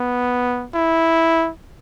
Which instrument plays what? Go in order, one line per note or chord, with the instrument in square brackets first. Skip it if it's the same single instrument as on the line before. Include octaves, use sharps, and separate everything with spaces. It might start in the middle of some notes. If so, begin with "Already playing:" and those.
Already playing: [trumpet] B3
E4